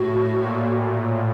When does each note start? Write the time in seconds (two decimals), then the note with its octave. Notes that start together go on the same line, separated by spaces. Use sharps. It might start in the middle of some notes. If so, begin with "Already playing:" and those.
Already playing: A2 F#4
0.39 A#2